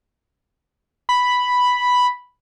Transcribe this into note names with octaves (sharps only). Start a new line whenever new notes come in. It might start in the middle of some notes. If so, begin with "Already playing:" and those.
B5